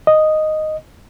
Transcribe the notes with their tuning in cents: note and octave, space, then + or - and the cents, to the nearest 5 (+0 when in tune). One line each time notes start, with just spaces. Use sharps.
D#5 -5